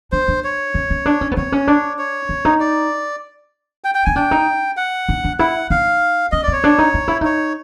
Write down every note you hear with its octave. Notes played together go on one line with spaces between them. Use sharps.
D4 C5
D4
C#5
C#4
C#4
D4
C#4
B3
C4 C#5
C#4
D4
C#5
C#4
D#4
D5
G5
G5
D#4 G#5
D4 G5
D#4
F#5
D#4
D4
E4 F#5
D#4 F5
C#4 D#5
D5
C4 C#5
D4
D#4
D#4
E4
D#4 C#5